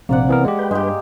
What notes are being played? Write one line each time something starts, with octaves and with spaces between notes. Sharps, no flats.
A#1 C3 A#3 C4 D5 F#5
E3 B3 A#4
G#3 G4
B4 G5
G2 G#3 G4